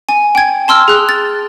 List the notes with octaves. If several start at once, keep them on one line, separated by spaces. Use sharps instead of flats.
G#5
G5 G#6
A5 C6 E6 F6
G#4 F#6
A6